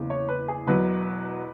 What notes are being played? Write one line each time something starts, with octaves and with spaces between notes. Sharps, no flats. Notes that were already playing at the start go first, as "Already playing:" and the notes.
Already playing: F#1 E2 C#3
C#5
B4
G#4
E1 E2 B2 F#3 B4